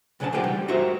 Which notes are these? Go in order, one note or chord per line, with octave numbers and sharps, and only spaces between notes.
B1 C#3 D4 G5 A5
E3 F3 G#3 D#4 F#4 G4
G3
F#4 G4 A#4 C5 E5